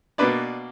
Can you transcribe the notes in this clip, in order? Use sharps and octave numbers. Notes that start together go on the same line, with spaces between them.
B2 A#3 D4 B4 D5